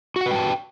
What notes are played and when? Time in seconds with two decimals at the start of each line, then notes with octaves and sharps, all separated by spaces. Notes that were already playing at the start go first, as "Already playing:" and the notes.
0.16 F#4
0.21 F#5
0.26 B4
0.31 G5
0.36 A5